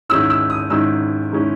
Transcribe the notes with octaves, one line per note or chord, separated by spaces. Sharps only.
G#2 D#3 G#3 C#4 E4 E6
E6
D#6
G#2 D#3 G#3 C#4 E4 E6
D#3 G#3 C#4 E4